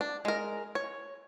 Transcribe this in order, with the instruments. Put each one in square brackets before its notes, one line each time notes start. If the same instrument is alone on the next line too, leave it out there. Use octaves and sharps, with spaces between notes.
[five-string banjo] D4
G#3 A#4
C#5